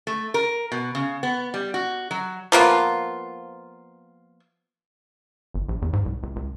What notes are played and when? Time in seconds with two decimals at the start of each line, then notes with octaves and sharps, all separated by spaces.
0.07 A3
0.34 A#4
0.72 B2
0.95 C#3
1.23 B3
1.54 G3
1.74 F#4
2.11 F#3
2.52 F3 A#3 B3 F4
5.54 G1
5.69 A#1
5.82 E2
5.93 G#2
6.06 C2
6.23 C#2
6.36 C#2